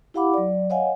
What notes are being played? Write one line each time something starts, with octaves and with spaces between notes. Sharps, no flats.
E4 G4 F5 F#5 B5 D6
F#3 D5
C#5 D#5 F5 F#5 G#5